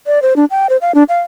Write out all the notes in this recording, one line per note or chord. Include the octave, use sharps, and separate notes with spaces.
D5
C5
D4
G5
C5
F5
D4
F5